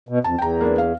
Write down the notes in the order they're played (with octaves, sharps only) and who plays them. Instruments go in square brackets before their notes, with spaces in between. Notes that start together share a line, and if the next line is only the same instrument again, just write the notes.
[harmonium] B2
[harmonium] F2 [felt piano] A5
[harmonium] E2 [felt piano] G5 A#5
[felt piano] A#3 B3 D4
F5